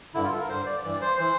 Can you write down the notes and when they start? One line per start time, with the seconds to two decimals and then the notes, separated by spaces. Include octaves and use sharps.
0.14 G2 D3 E4
0.24 F4
0.32 A4
0.40 A#4
0.49 G2 D3 C5
0.66 D5
0.84 G2 E3 D5
1.01 C5
1.18 E3 C5